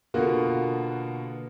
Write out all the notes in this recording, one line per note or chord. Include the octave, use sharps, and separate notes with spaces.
B2 D3 A#3 B3 F4 F#4